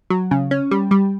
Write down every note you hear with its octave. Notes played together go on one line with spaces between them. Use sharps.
F#3
C#3
C#4
G3
G3